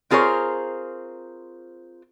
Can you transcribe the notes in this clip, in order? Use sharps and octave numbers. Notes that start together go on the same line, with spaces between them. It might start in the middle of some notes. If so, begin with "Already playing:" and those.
C4 F4 G#4 A#4 C5 C#5